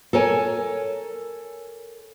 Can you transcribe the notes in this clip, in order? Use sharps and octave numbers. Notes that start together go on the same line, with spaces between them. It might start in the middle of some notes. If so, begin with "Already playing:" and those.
A4 A#4 C#5 G#5